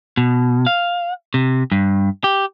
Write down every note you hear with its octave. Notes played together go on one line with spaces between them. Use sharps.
B2
F5
C3
G2
G4